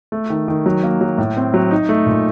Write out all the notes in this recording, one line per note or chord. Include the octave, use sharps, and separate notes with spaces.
A3
D#3
D#3
F#3
A#3
F#3
A2
C4
F#3
D#4
A3
A#2